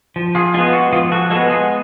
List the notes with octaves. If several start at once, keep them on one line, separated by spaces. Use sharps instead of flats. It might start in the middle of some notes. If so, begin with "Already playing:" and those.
F3
F4 G#4
G#3 B3 F4 G#4
F4
F#4
F3 F4 G#4
F#4 A4
G#3 B3 F#4 A4
F4 G#4